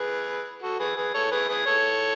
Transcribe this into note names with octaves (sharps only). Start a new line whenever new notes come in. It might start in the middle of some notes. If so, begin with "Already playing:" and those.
Already playing: G#4 B4
F#4 A4
G#4 B4
G#4 B4
A4 C#5
G#4 B4
G#4 B4
A4 C#5